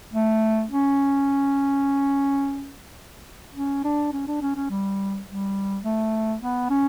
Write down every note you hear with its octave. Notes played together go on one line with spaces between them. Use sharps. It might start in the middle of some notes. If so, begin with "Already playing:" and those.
A3
C#4
C#4
D4
C#4
D4
C#4
C#4
G3
G3
A3
B3
C#4